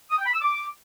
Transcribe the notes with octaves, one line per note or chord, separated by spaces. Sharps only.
D#6
G5
B5
E6
D6